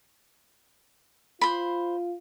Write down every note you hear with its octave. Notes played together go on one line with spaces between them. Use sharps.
F4 C5 B5